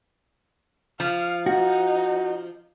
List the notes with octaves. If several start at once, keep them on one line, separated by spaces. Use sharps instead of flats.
F3 F5
D#4 F#4